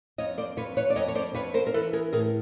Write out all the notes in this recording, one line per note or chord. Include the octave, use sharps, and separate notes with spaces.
F2 C#5 D#5
C5 D5
F2 B4 C#5
B4 C#5
D5
F2 C#5 D#5
C#5
C5 D5
F2 B4 C#5
A#4 C5
A#4
E3 A4 B4
G#4 A#4
A2 G#4 A#4